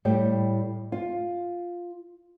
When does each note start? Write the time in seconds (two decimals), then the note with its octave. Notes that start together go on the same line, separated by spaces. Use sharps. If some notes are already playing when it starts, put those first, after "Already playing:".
0.05 A2 G3 G5
0.92 F4